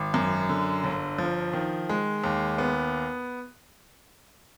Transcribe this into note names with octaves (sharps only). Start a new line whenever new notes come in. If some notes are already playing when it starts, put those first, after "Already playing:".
Already playing: G#1
F#2
D3
G1
F3
D#3
G#3
D#2
B3